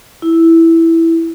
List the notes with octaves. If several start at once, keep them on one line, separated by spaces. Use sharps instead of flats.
E4